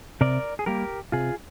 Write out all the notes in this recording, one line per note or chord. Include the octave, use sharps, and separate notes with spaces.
C3 A#4 D5
G#4
G3 A#3 G4 A#4
C3 F4 G#4